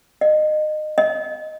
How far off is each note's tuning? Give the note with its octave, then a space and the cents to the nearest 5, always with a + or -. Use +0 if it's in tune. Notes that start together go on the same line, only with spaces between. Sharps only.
D#5 -25
D#5 +5